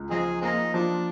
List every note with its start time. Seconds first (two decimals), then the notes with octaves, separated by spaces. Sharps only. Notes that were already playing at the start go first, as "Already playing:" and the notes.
Already playing: C#2
0.10 F3 C4 D#4 G#4
0.41 G#3 A#3 C4 D#4
0.74 F3 D4